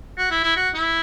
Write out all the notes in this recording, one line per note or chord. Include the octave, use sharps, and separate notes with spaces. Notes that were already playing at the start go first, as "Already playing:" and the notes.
F#4
E4
E4
F#4
E4